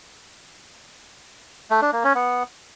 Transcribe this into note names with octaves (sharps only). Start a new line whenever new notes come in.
A3
D4
A#3
C#4
B3